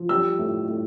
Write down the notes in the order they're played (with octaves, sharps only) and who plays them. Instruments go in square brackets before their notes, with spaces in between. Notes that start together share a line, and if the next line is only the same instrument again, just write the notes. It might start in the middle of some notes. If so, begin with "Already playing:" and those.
Already playing: [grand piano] F3
G3 E6
A2
A2